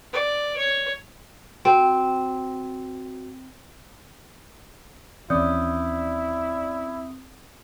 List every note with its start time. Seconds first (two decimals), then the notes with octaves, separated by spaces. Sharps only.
0.13 D5
0.56 C#5
1.65 C4 F#4
5.30 D#2 E3 C4 C#4 E4 D5 D#6 G6